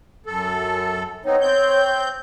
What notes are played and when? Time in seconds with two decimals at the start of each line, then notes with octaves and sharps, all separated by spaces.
0.26 F#2 A4
1.25 B3 C4 D#4 C#5
1.41 C4 G6